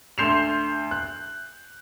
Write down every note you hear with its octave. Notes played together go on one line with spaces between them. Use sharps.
D2 C6 G6 C7 E7 F7
F#6